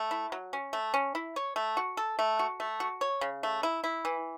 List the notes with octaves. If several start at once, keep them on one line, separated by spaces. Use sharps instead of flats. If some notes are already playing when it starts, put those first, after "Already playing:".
Already playing: A3
E4
F#3
C#4
A3
C#4
E4
C#5
A3
F#4
A4
A3
F#4
A3
F#4
C#5
C#3
A3
E4
E4
E3